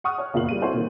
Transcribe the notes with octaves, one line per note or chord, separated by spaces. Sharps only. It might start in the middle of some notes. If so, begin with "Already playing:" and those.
F#5 C#6 D#6 F6 F#6
C#5
F#1 E2 A#2 F4 F5 F#7
G3 D#7
C4 E4 F#4 A4 C5 C#5
A#2 D#3